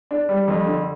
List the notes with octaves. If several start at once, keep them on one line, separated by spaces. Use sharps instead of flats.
D4
G3
F2
D3